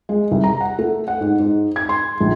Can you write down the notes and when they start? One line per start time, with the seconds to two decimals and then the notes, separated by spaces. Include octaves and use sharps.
0.09 G#3
0.31 C2
0.44 A#5
0.61 F#5
0.79 A3
1.08 F#5
1.21 G#2
1.39 G#2
1.76 G#6
1.89 C6
2.21 A#1